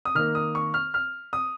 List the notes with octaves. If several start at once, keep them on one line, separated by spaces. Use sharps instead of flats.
D#6
D#3 A#3 F6
D#6
C#6
F6
F6
D#6